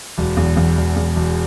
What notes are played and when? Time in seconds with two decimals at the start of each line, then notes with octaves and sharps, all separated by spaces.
0.18 E1
0.37 E2
0.57 E2
0.77 E1
0.96 E2
1.16 E1